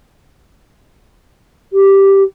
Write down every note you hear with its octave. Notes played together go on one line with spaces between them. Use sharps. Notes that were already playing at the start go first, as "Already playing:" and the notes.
G4